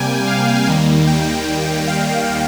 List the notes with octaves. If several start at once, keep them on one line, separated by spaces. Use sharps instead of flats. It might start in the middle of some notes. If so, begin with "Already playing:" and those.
Already playing: C3 G3 A#3 G5 G#5
F5
D#2 D#3 G3 A#3
G5
F5